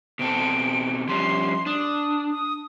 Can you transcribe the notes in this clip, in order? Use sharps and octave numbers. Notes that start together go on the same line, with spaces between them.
B2 C4 A4 D7
F3 G3 C#4 C6
D4 D#6
D#6